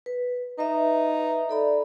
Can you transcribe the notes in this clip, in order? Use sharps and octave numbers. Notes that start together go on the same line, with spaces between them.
B4
D#4 B4 E5
A4 D5 B5